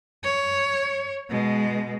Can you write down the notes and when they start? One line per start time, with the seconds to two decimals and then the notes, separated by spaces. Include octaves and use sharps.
0.24 C#5
1.29 B2 G#3